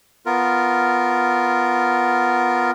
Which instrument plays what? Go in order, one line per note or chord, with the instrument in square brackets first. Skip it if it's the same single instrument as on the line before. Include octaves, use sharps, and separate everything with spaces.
[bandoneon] B3 F4 A#4